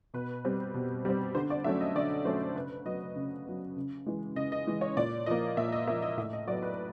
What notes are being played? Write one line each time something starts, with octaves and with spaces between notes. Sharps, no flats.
B2 B4
G3 C4
B2
G3 C4
D3 C5
D5
F#3 A3 C#4 E5
D#5
D3 D5
F#3 A3 C#4 C5
C#3 B4
F#3 B3 D#5
C#3
F#3 B3
C#3
E3 G#3
C#3 D#5
D#5
E3 G#3
C#5
A#2 D5
F3 A#3 D#5
A#2 E5
D#5
F3 A#3 E5
D#5
A2 E5
D#5
F#3 B3 D5
B4